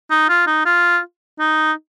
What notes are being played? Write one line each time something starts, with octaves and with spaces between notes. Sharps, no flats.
D#4
F4
D#4
F4
D#4